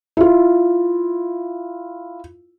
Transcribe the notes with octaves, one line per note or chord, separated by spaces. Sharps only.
E4 F4